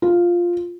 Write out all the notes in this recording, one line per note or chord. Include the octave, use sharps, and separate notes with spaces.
F4